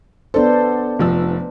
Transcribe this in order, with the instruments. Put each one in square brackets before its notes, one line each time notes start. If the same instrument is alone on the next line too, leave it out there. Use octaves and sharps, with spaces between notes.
[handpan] B3 D4 C5 [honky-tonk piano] A4
[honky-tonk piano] F1 F3 E6